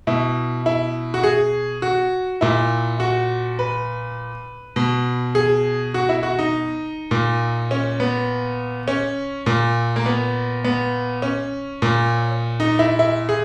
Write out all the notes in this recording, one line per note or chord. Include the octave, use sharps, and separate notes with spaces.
B2 E4
E4
F#4
G#4
F#4
A#2 E4
F#4
B4
B2
G#4
F#4
E4
F#4
D#4
A#2
C#4
B3
C#4
A#2
A#3
B3
B3
C#4
A#2
D#4
E4
E4
G#4